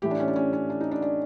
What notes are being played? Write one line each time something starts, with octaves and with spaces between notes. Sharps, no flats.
A2 E3 G4
D4
C#4
D4
C#4
C#4
D4
D#4
D4
D4